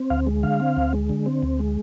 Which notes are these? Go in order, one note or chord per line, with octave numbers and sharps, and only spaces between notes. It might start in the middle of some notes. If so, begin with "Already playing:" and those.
Already playing: C4
D2 F5
G#3
D3 F5
C4
D2
G#3
D3
C4
D2
G#3